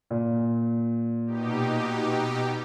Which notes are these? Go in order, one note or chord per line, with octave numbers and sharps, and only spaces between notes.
A#2
B2 D#4 G4